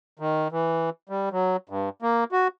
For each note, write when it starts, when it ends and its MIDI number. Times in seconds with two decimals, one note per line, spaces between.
0.19 0.48 51
0.52 0.90 52
1.09 1.29 55
1.32 1.57 54
1.69 1.89 43
2.02 2.24 58
2.32 2.48 66